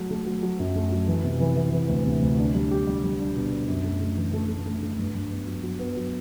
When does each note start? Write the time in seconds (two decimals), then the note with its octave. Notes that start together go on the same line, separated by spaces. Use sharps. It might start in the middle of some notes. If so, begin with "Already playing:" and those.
Already playing: F#3 A3
0.11 A3
0.26 F#3
0.43 F#3
0.60 F#2
0.76 A3
0.92 F#3
1.08 E3
1.24 C3
1.40 E3
1.57 E3
1.73 E3
1.89 D2
2.05 C3
2.22 D2
2.39 D4
2.54 G3
2.71 G4
2.87 G3
3.03 G3
3.20 D4
3.35 B2
3.53 D4
3.68 F#2
3.84 A3
4.01 A3
4.16 E3
4.34 A3
4.49 A3
4.66 A3
4.83 A3
4.99 G2
5.15 G2
5.30 B3
5.47 F#3
5.63 F#3
5.79 B3
5.97 F#3